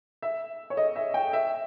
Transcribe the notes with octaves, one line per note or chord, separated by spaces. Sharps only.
E5
C#5
D#5
E5
G5
E5